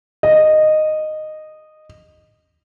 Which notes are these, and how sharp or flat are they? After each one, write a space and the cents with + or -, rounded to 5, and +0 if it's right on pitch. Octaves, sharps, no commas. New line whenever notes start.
D#5 -10